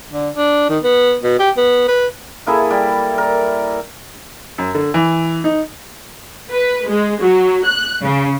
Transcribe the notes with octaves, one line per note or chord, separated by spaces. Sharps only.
D3
D4
D#3
B3
B2
G4
B3
B4
A#3 E4 G#4 A4
G3 D5
A#4
F#2
D3
E3
D#4
B4
G#3
F#3
F#6
C#3